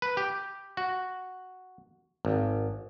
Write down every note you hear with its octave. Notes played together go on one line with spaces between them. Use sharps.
B4
G4
F#4
G#1